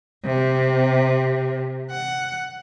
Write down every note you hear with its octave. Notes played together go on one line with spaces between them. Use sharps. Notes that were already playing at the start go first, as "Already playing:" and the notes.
C3
F#5